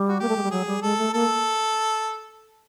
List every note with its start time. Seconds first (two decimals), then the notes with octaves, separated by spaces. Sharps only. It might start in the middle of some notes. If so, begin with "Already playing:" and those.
Already playing: G3
0.08 F#4
0.20 A#3 G4
0.29 A3
0.37 G#3
0.43 G3
0.51 F#3 G#4
0.67 G3
0.82 G#3 A4
0.98 A3
1.14 A#3 A4